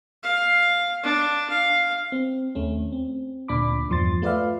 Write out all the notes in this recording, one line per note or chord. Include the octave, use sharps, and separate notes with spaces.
F5
D4
F5
C4
D#2 A3 C#4
C4
D2 A#2 D4 B5 D6
E2 G2 F3 C6 A6
A3 F4 B4 D5 E5 F5